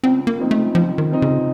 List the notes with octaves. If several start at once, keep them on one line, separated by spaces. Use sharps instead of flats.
C#2 C4
A#3
C3 F3 C4 D#4
A3
C#2 F3
D#3
C3 F3 C4 D#4
C#3